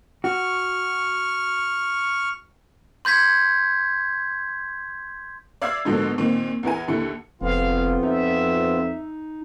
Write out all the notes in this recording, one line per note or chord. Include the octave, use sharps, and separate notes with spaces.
F#4 C#6 F6
C6 G6 G#6 B6
D5 E5 F5 E6 G#6 C7
G#2 B2 D3 F3 F#3 A#3
A#2 D#3 C4
E2 E4 A#4 G#5
D#2 D3 E4 C#7
F1 F2 B3 C4 F4 F5
D#4 E5